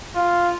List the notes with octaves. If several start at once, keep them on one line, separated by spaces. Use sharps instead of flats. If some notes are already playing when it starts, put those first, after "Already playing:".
F4